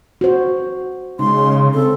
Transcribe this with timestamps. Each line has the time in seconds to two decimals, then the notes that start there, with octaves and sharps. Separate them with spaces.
0.21 F#4 C5
1.19 C#3 G#3 D#4 C6
1.74 C4 A4